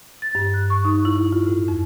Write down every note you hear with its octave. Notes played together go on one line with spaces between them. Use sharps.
A6
G2
F#6
C#6
D#4
E4
F4
A2
F2